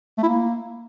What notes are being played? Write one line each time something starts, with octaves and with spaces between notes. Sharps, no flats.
A3
E4
A#3